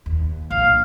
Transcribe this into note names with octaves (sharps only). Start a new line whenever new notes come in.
D#2
A#1 F5